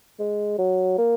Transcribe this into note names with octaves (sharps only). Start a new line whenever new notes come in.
G#3
F#3
A#3